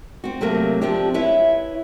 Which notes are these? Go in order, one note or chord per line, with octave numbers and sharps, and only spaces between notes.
C4 F#4
C3 F#3 A3 A#3
F3 C4 D4 G4
E4 B4 C#5 E5